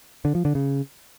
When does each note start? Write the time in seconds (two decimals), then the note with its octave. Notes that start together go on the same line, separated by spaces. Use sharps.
0.25 D3
0.35 F3
0.45 D3
0.55 C#3